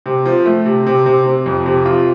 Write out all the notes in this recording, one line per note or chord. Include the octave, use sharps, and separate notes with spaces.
C3
F3
A3
C3
C3
C3
C3
F2
C3
F4